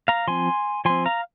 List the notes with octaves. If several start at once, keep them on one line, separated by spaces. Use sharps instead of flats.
F5 A#5
F3 C4 G#5 C6
F3 C4 G#5 C6
F5 A#5